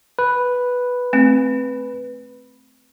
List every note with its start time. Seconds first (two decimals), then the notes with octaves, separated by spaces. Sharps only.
0.19 B4
1.13 A3 C4